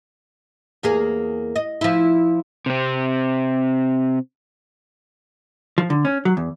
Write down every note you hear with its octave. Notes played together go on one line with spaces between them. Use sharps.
E2 A#3 G#4
D#5
F3 E4
C3 C4
F3
D3
C#4
F#3
E2